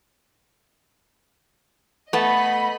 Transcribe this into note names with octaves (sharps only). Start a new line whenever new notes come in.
A3 B3 D#5 B5